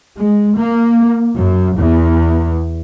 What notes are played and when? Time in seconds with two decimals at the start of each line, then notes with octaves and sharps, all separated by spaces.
0.17 G#3
0.55 A#3
1.36 F#2
1.77 E2